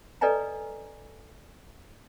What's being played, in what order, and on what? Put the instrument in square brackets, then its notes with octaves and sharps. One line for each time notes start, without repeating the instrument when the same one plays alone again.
[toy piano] A4 B4 D5 D#5 G#5 A#5